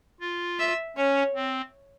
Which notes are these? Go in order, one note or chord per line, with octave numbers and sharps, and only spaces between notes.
F4
E5
C#4 C#5
C4